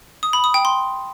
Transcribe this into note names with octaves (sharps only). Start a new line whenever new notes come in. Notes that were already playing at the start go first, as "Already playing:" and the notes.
D#6
B5
D#6
G5
C6